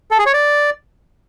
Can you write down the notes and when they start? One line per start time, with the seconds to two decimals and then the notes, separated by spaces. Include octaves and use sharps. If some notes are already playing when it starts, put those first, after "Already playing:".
0.11 A4
0.18 G#4
0.26 C#5
0.33 D5